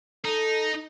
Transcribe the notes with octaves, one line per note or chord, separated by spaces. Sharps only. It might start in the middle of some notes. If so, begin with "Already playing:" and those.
D#4 A4